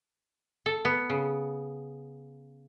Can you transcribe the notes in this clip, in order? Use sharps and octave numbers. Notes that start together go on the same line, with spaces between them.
A4
B3
C#3